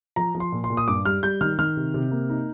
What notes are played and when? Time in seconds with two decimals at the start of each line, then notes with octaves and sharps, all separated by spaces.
0.16 F3 A#5
0.35 F3
0.40 C6
0.52 A#2
0.64 C6
0.70 A#2
0.77 D#6
0.88 G2 D6
1.05 G3 F6
1.23 G3 G6
1.41 D#3 F6
1.59 D#3 F6
1.77 C3
1.94 C3
2.11 A#3
2.30 D#4